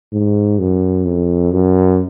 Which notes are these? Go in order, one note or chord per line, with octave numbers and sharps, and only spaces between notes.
G#2
F#2
F2
F#2